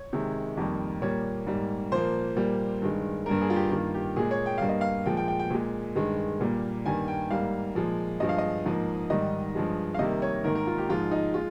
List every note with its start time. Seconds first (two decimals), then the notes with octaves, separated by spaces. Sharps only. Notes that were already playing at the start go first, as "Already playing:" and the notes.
Already playing: C#5
0.13 C3 D#3 G#3
0.57 F2 D#3 G3 A#3
1.02 A#2 G3 A#3 C#5
1.47 G#2 G3 A#3
1.92 A#2 F3 A#3 C5
2.36 A#2 G3 A#3
2.81 G2 D#3 G#3
3.26 G2 G3 A#3 A#4
3.41 G#4
3.50 F4
3.56 G4
3.71 G2 D#3 A#3 F4
3.94 G4
4.16 A#2 G#3 G#4
4.31 C#5
4.46 G5
4.58 G2 G3 A#3 F5
4.69 D#5
4.81 F5
5.06 A#2 F3 G#3 G5
5.17 G5
5.28 G5
5.39 G5
5.50 A#2 G#3
5.95 G2 D#3 G#3
6.41 A#2 G3 A#3
6.85 G2 D#3 G3 A#3 G#5
7.08 G5
7.30 G#2 G3 A#3 F5
7.75 A#2 F3 G#3
8.20 G2 F3 G#3 D#5
8.29 F5
8.38 D#5
8.65 G#2 F3 A#3
9.10 G#2 D#3 G3 D#5
9.55 G2 F3 G#3
9.94 F5
9.99 C3 D#3 G3 A#3 D#5
10.22 C#5
10.44 G#2 D#3 A#3 A#4
10.55 A#4
10.67 F4
10.78 G4
10.89 G#2 F3 G#3 F4
11.12 D#4
11.34 G#3 F4